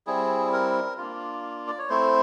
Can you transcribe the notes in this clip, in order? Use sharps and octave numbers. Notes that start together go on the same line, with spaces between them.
G3 C4 E4 G#4
A#4
A#3 D4 F4
D5
C#5
A3 C4 E4 C5